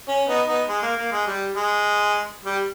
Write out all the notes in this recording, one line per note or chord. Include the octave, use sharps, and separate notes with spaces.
C#4
B3 D#4
B3 D#4
G#3
A#3
A#3
G#3
G3
G#3
G3